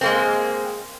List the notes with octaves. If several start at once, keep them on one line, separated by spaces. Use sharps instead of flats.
G#3 A#3 C4